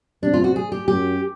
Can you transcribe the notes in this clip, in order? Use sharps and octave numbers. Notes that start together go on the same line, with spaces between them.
C3 D4
F4
F#4
G#4
G4
F#2 G4